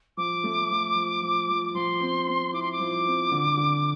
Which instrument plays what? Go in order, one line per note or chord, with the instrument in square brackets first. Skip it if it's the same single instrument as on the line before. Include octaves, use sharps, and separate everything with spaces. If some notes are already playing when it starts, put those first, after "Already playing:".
[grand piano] F3 [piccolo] D6
[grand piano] A3
F3
F3
F3
F3
[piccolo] D6
[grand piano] F3 [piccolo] C6
[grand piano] C4
C4
[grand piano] E4 [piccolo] D6
[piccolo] C6
D6
[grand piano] F3
C4
D3
D3